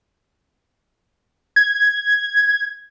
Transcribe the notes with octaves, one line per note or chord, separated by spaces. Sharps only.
G#6